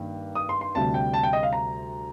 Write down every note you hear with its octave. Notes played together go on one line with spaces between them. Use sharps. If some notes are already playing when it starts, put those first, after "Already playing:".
Already playing: G2 D#3 A#3
D#6
C6
C6
D2 C3 G3 A5
G5
A5
G5
D#5
F5
A#5